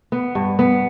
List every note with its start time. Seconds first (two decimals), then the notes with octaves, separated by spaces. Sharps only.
0.12 B3
0.35 G2
0.59 B3